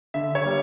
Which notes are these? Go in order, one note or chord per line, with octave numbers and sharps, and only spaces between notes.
D3 E5
C#5
G3 A#3